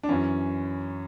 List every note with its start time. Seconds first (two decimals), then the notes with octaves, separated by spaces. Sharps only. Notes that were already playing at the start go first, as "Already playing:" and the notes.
0.03 D4
0.09 F#2 E3 C#4